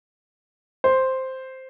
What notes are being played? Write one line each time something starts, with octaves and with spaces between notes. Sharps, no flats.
C5